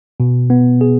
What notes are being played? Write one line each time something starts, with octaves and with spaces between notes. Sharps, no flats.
B2
B3
G#4